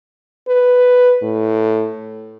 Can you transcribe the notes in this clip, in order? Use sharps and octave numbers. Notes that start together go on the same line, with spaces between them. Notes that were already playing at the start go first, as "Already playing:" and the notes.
B4
A2